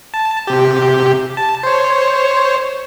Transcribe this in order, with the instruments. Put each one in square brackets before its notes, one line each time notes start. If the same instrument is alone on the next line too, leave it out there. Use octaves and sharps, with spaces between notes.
[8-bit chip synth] A5
C3 G4
A5
C5 C#5